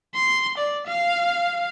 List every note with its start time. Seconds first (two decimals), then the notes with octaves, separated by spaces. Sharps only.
0.15 C6
0.58 D5
0.86 F5